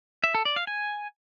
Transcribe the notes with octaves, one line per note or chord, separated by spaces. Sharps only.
E5
A4
D5
F5
G#5